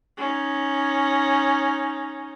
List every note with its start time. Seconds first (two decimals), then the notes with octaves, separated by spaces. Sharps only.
0.17 C#4 D#4